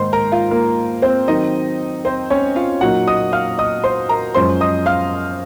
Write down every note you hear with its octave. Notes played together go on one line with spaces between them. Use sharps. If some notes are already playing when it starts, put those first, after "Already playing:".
Already playing: G#2 D#3 A#3 C5 C6
A#4 A#5
F4 F5
A#3 A#4
C4 C5
D#3 F#3 C4 D#4 D#5
C4 C5
C#4 C#5
F4 F5
A#2 F#3 A#3 D#4 F#4 F#5
D#5 D#6
F5 F6
D#5 D#6
C5 C6
A#4 A#5
F#2 F3 G#3 C#4 C5 C6
D#5 D#6
F5 F6